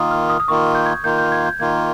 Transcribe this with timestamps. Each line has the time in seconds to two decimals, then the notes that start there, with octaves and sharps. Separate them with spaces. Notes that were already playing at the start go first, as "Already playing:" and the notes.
Already playing: D#3 A#3 F4 D#6
0.11 F6
0.30 D#6
0.40 D#6
0.48 D#3 A#3 F4 C#6
0.75 G6
0.86 G#6
1.04 D#3 A#3 F4 G6
1.18 G6
1.32 G#6
1.46 G6
1.60 D#3 A#3 F4 G#6